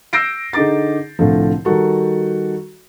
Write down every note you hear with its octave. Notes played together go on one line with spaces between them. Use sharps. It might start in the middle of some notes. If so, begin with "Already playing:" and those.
E6 G6 A#6 C7 D7
D3 D#4 G#4 D6 A6
C2 A2 D3 F3
D#3 G3 F#4 A4